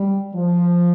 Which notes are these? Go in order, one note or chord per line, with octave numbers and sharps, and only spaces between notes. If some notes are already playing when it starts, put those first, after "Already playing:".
Already playing: G3
F3